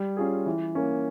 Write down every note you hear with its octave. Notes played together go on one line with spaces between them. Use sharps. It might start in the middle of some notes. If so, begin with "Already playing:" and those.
Already playing: G3
C#4 F4 G#4
E3
A#3 C#4